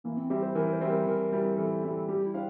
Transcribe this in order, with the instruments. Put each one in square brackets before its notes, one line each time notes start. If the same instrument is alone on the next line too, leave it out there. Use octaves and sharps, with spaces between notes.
[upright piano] E3 [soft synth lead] A#3
[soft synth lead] C4
[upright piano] G3 C4 E4 [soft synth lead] G4
[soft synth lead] C5
[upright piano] E3 [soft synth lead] A#4
[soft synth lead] C5
[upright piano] G3 C4 E4
[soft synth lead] A#4
[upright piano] E3 [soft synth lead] A#4
[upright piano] G3 C4 E4
[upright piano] E3 [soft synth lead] A4
[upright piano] G3 C4 E4
[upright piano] G3 [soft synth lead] G4
[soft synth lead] E4
[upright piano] D4 G4 C5 F5